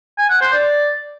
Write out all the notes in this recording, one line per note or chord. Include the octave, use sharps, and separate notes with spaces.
G#5
F#5
C5
D5